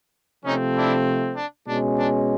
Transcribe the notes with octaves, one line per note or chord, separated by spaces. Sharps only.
C3 F3 A3 C4 C#4 D#4
D4 E4
D4
B2 G#3 C#4 D4
D4